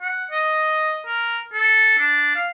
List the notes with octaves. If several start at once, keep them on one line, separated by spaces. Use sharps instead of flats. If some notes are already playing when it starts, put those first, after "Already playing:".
F#5
D#5
A#4
A4
D4
F5